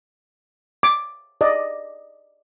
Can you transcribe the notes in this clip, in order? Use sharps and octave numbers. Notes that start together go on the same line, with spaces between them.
D6
D5 D#5